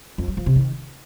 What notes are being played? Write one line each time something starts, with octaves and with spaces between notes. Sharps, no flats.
F2
F#3
F3
C3
D#3